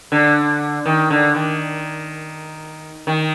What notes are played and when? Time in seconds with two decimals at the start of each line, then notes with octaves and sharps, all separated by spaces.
0.12 D3
0.86 D#3
1.10 D3
1.35 D#3
3.07 D#3